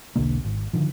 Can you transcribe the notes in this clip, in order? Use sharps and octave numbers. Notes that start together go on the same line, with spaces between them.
E1 B1 D3 A#3
G#1
D3 D#3 F3